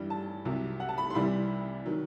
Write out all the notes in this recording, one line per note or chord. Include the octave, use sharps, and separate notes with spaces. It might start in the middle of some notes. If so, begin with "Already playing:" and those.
Already playing: G2 E3 G3
A5
C2 C3 F#3
F#5
A5
B5
C6
C2 C3 E3 G3 B5
D#3 F#3